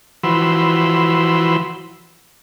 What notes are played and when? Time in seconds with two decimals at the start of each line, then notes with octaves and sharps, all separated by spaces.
0.24 E3 F3 F#4 B5 C6 E6